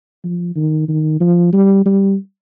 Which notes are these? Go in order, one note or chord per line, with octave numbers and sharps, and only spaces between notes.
F3
D#3
D#3
F3
G3
G3